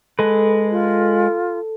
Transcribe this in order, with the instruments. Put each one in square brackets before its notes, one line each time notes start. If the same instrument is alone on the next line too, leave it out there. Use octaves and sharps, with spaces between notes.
[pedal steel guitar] G#3 B4 [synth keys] A4
[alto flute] F4